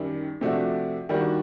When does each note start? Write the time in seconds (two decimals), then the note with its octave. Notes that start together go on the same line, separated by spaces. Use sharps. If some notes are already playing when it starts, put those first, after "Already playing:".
Already playing: F#2 D#3 G3
0.41 C3 F3 A3 D4 F#4
1.09 D#3 G3 A#3 D4 F#4